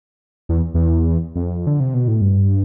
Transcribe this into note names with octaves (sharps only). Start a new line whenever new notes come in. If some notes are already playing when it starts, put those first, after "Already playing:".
E2
E2
F2
D3
C3
B2
A2
G2